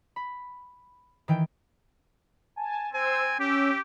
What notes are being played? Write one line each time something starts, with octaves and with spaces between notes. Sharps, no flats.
B5
D#3 E3 G5
G#5 A5
C4 C5 G#5 E6
C#4 G4 E6